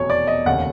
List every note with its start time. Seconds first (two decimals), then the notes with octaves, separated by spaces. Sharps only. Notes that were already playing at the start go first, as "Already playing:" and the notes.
Already playing: F1 E2 B2 C#5
0.10 D5
0.27 D#5
0.46 F1 D#2 C#3 F#5